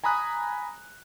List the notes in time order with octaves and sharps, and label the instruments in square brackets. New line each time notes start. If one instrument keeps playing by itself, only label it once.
[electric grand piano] G#5 A#5 B5 D#6 F#6